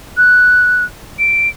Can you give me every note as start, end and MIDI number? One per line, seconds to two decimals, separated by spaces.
0.17 0.84 90
1.19 1.49 98